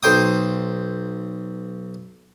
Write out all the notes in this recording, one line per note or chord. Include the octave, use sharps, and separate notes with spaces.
B1 C5 G5 D#6